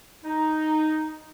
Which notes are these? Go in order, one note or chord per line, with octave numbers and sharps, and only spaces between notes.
D#4